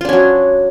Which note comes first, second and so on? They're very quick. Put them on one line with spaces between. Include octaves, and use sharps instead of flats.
F4 D4 C#4 F#3